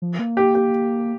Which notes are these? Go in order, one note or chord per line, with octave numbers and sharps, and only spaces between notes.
F3
A#3
G4
G4